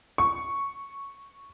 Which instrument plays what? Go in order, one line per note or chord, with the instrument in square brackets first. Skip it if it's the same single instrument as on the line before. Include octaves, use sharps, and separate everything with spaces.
[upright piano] C#6